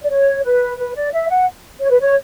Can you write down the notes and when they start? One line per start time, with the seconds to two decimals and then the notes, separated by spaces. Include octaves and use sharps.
0.03 D5
0.10 C#5
0.44 B4
0.78 B4
0.95 D5
1.12 E5
1.29 F#5
1.80 C#5
1.90 B4
2.00 C#5